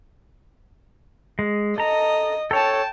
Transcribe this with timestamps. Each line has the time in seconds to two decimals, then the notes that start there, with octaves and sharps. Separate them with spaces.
1.39 G#3
1.78 A4 D#5 A#5
2.51 A4 C#5 G5 A5